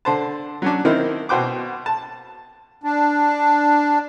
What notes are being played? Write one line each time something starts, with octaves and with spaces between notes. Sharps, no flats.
D3 C5 A5
F#3 C#4 D4
D#3 C4 D#4 E4 A#4
B2 F#4 C5 G5 D6
A5
D4